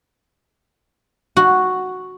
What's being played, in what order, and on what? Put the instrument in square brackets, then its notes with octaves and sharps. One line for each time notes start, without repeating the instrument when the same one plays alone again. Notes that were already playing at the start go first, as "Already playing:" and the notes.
[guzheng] F#4